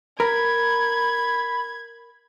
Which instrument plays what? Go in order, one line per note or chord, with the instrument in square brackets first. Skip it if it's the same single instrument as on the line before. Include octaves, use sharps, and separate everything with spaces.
[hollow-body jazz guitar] A#4 [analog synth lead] B5 [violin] G#6